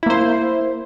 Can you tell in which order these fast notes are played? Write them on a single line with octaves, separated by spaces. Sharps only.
E4 A#3 C5